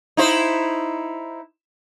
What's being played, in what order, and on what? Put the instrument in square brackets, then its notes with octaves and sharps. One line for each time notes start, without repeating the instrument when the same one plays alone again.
[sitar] D#4 E4 C5